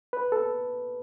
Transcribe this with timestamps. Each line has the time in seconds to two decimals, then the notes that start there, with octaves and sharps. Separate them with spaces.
0.13 B4
0.32 A4